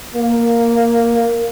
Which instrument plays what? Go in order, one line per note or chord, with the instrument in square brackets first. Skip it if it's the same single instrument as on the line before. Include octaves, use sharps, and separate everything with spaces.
[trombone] A#3